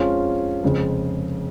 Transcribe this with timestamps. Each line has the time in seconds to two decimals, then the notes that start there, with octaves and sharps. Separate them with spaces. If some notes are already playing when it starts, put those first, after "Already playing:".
Already playing: F2 F3 G#3 C#4 F4
0.63 F1 F2 C#3 G#3